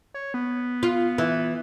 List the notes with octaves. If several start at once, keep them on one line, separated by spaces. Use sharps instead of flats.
C#5
B3
F4
E3